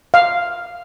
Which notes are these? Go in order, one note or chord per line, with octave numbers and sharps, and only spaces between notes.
F5